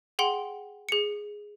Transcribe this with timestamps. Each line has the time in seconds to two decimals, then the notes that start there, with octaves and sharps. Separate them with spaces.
0.19 G#4 F#5 G5 C6
0.89 G#4 C#7